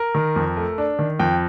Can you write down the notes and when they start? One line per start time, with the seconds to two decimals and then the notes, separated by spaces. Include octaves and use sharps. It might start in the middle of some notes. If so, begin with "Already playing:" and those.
Already playing: A#4
0.15 D#3
0.36 F2
0.57 A3
0.78 D4
0.99 D#3
1.19 F2 G5